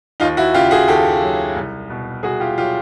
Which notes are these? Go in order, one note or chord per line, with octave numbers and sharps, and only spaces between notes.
D#2 D#4 F4
E4 F#4
C#3 F4 G4
F#4 G#4
D#2 G4 A4
F#3
C2
B2
C2 F#4 G#4
F4 G4
F#3 F4 G4